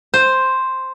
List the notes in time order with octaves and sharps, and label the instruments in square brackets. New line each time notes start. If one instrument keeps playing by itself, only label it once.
[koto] C5